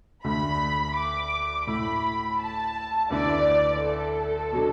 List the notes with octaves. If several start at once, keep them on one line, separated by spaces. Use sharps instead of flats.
D2 D3 A3 B5
D6
A2 A3 E4 B5
A5
D2 D3 B3 E4 D5
A4
B2 F#3 D4